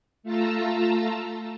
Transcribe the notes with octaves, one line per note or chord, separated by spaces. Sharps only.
A3 F4 A5 A#5 E6